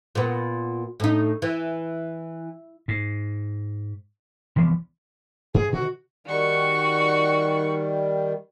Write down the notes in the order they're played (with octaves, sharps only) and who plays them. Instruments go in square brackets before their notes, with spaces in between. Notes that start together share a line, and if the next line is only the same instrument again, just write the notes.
[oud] A#2 B3
A2 D#4
E3
[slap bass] G#2
C2 E3 F3 B3
[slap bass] G2 [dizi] G#4
[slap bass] B2 D3 D#3 [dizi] F#4
[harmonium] D#3 G3 [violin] F#4 C#6